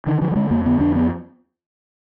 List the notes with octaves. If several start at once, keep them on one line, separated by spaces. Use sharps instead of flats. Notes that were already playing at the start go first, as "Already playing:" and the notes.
D3 D#3
D3 F3
F#3
D3 G#3
F2 A#3
D3 B3
F2 D4
B3